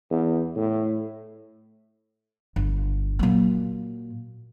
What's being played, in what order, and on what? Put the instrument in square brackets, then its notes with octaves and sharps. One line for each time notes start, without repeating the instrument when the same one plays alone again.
[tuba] E2
A2
[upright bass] G1
A#2 F#3